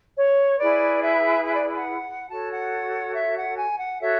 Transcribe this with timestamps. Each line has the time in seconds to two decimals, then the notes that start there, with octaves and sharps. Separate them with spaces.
0.16 C#5
0.58 E4 G#4 B4 D5
1.01 E5
1.45 E5
1.55 D5
1.76 F#5
2.30 F#4 A4 C#5 A5
2.52 F#5
3.15 E5
3.36 F#5
3.58 G#5
3.79 F#5
4.01 F#4 A4 C#5 E5